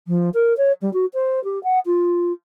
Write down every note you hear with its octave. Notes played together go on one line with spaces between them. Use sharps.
F3
A#4
C#5
G3
F#4
C5
G4
F#5
F4